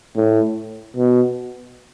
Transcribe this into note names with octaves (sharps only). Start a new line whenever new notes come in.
A2
B2